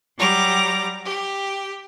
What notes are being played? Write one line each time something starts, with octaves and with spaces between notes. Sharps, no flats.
F#3 G3 A#5 D6
G4